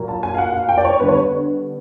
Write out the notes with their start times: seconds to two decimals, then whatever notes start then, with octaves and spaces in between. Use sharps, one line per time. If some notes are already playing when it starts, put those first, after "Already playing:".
Already playing: A#2 F#3 A#3
0.08 A5
0.23 G#5
0.34 F5
0.38 F#5
0.53 F5
0.69 G5
0.78 D5
0.85 C#5
1.00 D3 G3 B3 B4
1.08 C#5